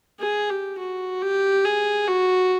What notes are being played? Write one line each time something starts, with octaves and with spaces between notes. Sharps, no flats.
G#4
G4
F#4
G4
G#4
F#4